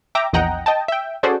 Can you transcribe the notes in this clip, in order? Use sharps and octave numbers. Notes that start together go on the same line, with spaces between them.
E5 G5 A#5 D6
A#1 E2 D#5 F#5 G5 A#5
D#5 G5 A5
E5 G5
C#4 F#4 G#4 A4 C5 D5